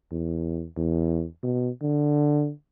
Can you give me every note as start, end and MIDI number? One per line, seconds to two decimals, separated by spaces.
0.11 0.67 40
0.77 1.26 40
1.43 1.69 47
1.82 2.51 50